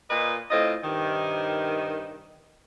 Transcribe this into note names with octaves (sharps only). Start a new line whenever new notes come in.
A#2 F4 B4 D#5
A2 C4 F4 D#5
G2 C3 D#3